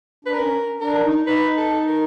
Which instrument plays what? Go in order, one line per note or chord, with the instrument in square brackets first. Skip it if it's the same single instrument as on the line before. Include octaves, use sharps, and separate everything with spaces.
[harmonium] D4 [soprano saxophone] B4
[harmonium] C#4 [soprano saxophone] A#4
[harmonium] D4 [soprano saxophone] A#4
[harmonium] D#4
[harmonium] D#4 [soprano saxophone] B4
[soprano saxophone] A4
A#4